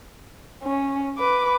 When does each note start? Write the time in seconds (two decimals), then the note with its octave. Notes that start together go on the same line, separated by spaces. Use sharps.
0.64 C#4
1.18 B4 D6